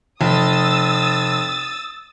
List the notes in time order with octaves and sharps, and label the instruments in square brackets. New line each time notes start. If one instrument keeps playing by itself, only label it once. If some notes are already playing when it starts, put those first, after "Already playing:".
[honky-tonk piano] F1 [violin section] D#6 E6 A6